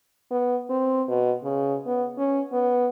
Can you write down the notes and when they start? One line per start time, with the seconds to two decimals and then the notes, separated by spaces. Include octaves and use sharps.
0.31 B3
0.70 C4
1.08 B2
1.43 C#3
1.87 B3
2.18 C#4
2.53 B3